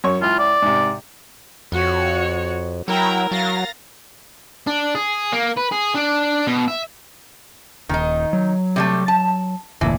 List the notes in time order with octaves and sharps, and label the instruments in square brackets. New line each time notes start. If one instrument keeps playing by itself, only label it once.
[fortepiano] F#2 C#5 C#6
[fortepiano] C#2 E4 F6 [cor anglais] F4
[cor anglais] D5
[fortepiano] G#2 C3
[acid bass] F2 [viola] F#4 C#5
[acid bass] F#3 [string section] E4 G5 A#5 [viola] A#4
[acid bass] F#3 [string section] F5 A6 A#6
[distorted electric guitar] D4
G#4
A#3
B4
G#4
D4
B2
E5
[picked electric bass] D#1 [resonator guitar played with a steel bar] D#3 D#4
[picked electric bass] F#3
[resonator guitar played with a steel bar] C3 G3 A3
A5
[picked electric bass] F1 D2 A#2 [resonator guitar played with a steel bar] E3